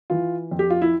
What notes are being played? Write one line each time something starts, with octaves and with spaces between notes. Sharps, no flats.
E3 F4
F2
G4
F4
E4